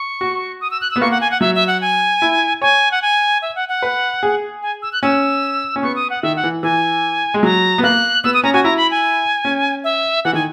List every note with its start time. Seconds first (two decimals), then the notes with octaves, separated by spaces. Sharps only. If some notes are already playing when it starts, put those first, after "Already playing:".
Already playing: C#6
0.21 F#4
0.61 D#6
0.71 E6
0.81 F#6
0.91 E6
0.96 B3
1.01 A#3 C#6
1.11 F#5
1.21 G#5
1.31 F#5
1.41 F#3 E5
1.55 E5
1.67 F#5
1.81 G#5
2.22 E4
2.61 C#5 G#5
2.92 F#5
3.02 G#5
3.42 E5
3.55 F#5
3.69 F#5
3.82 B4
4.23 G#4
4.63 G#5
4.82 E6
4.93 F#6
5.03 C#4 E6
5.76 C#4
5.83 B3 C#6
5.96 D#6
6.10 F#5
6.23 D#3 E5
6.36 F#5
6.44 E3
6.63 E3 G#5
7.34 G#3
7.43 F#3 A#5
7.78 B3
7.83 A#3 F#6
8.24 B3 E6
8.34 D#6
8.44 C#4 A#5
8.54 F#4 G#5
8.64 E4 A#5
8.77 B5
8.91 G#5
9.45 C#4
9.84 E5
10.24 E3 F#5
10.33 D#3 G#5